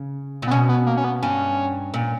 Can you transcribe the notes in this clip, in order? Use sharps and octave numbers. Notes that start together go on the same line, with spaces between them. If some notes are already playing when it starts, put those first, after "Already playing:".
Already playing: C#3
A#2
B3
B2 C#4
B3
A#3
C#4
B3
G2 C#4
A#2